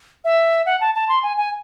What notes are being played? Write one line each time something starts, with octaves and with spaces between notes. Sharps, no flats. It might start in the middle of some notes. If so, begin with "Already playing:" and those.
E5
F#5
A5
A5
C6
G#5
G#5